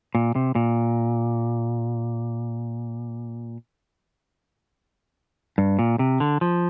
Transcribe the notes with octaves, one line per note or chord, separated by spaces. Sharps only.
A#2
C3
A#2
G2
A#2
C3
D3
F3